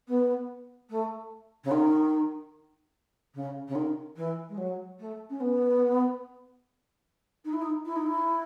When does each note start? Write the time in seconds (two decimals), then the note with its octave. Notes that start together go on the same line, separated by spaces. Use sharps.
0.08 B3
0.89 A3
1.64 C#3
1.71 D#3
3.34 C#3
3.68 C#3
3.75 D#3
4.16 E3
4.49 G#3
4.57 F#3
4.99 A3
5.30 C#4
5.40 B3
7.45 D#4
7.53 E4
7.61 D#4
7.85 E4
7.96 D#4
8.06 E4